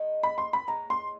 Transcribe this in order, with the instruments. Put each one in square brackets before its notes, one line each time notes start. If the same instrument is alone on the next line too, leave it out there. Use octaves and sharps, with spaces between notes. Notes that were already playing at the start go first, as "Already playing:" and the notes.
Already playing: [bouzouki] D#3 G#3 B3 D#4
[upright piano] B5
C6
B5
[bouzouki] A2 E3 G#3 C#4 [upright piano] A#5
[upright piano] C6